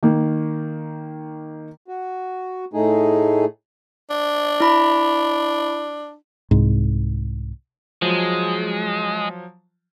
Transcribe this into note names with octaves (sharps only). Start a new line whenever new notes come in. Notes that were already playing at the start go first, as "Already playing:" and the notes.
D#3 A#3
F#4
A2 A3 D#4 G#4
D4
E4 B5
C2 G#2
F3 F#3 G#3